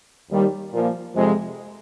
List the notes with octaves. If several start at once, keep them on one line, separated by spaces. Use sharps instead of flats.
D#2 D#3 G3
A#2 F3 A#3
F2 C3 F3 G#3